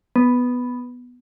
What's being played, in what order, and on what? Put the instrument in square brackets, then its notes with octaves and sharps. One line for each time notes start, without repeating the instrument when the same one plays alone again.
[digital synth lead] B3